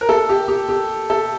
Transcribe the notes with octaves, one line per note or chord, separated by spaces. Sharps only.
A#4
A4
G4
G4
G4
A4